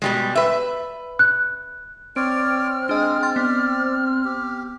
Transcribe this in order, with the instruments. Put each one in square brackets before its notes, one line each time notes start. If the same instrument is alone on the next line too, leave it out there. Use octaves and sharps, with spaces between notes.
[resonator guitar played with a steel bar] B2 G3 G#3
B4 E5
[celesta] F#6
[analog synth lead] C4 [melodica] C#5 D5 [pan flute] F6 [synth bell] D7
[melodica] G#3 G#4 [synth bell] D4 D#5
[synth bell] G5 C6 A6
[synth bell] B3 [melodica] D5
[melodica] G4